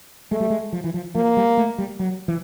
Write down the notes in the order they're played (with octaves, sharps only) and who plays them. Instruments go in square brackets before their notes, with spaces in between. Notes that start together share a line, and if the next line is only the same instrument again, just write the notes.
[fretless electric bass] G#3 [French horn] A3
[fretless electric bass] G3
G#3
F3
E3
F3
[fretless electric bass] F3 [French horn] A#3
[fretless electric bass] G3
A3
G3
F#3
E3